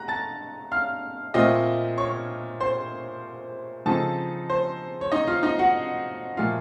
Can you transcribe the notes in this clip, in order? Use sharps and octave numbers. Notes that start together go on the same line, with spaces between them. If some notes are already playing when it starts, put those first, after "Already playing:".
Already playing: A#5 F#6 A#6
A5 A6
F5 F6
A#2 A3 C4 F4 D#5 D#6
C#5 C#6
C5 C6
C#3 F3 C4 D#4 A4 A5
C5
C#5
D#4 D#5
F4 F5
D#4 D#5
F#4 F#5
A#2 F3 A3 F4 F5